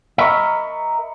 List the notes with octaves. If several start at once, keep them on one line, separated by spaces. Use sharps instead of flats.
A#4 D#5 E5 B5 C#6